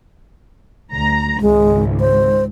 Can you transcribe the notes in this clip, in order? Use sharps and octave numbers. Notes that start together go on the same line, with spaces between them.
D2 A#5
G#1 C#2 G#3
C5